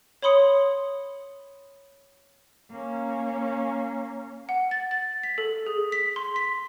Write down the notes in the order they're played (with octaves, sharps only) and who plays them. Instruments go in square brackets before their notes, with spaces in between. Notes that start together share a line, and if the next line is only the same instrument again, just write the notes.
[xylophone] C#5 B5 C6 D#6 C#7
[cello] A#3 C#4
[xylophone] F#5
A6
A6
B6
A4
G#4
B6
C6
B6